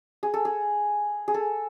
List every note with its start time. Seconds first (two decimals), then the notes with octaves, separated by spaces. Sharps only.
0.23 G#4
0.34 A4
0.45 G#4
1.28 G#4
1.34 A4